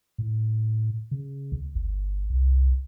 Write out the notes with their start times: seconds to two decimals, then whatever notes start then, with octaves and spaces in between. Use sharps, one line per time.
0.18 A2
1.11 C#3
1.52 D2
1.76 G1
2.30 C2